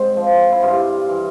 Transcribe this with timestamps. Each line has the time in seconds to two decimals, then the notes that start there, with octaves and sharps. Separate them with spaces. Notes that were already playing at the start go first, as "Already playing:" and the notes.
Already playing: G#2 C4
0.16 F3
0.52 E4
0.62 G2 F4
1.09 E3